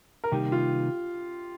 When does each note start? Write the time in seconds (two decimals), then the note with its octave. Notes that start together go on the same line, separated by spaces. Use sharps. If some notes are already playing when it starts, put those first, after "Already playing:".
0.24 A#4
0.32 C3 D#3 G3 A#3 D#4 G4
0.52 F4